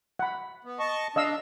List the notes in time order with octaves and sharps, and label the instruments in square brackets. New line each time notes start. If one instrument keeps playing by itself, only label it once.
[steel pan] F#5 B5
[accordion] B3
D#5 A5 C#6
[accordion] D4 [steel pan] D#5 F5 E6